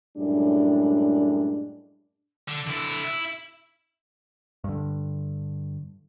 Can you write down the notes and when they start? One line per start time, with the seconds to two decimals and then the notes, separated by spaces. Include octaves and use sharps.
0.17 F#2 A2 G3 G#3 D4
2.48 D3
2.67 D3 E4
3.04 E4
4.64 G2 D3